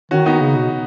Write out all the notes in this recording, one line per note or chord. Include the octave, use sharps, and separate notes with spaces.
D#3 C#4 F#4
B3 D#4
C#3
B2